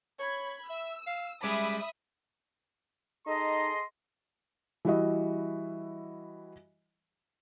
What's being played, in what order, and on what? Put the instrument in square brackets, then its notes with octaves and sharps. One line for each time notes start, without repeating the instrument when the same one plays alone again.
[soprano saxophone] C#5 [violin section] B5 G#6
[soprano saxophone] E5 [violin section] E6
[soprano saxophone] F5
[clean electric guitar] G3 G#3 C#4 [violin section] E5 B5 D#6 [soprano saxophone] D6
[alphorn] D#4 [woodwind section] G#4 A4 D#5 [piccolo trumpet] C6
[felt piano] E3 G3 E4 F#4 D#5